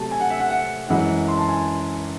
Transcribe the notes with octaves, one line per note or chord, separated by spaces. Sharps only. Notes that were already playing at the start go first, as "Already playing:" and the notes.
Already playing: C3 F#3 A3 A5
G#5
F#5
E5
F#5
F#5
F#2 E3 G#3 F#5
C6
A5
G#5
C6